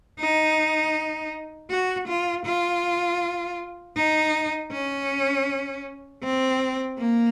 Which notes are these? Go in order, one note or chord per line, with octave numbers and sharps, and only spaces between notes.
D#4
F#4
F4
F4
D#4
C#4
C4
A#3